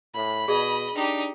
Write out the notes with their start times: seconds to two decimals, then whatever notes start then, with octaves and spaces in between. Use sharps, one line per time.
0.15 A2 B5
0.48 B2 G#4 D5 D#5
0.95 D4 D#4 G4